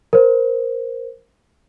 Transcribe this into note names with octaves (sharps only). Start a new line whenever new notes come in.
A#4 C5